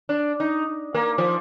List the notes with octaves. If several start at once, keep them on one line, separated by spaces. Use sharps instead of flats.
D4
D#4
A#3
F3